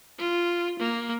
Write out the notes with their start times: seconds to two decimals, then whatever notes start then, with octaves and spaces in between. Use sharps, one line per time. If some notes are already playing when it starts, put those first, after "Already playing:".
0.18 F4
0.79 A#3